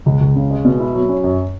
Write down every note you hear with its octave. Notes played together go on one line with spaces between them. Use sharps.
C#2
C#2
C#3
G#3
B2
E4
F#3
C#4
F#2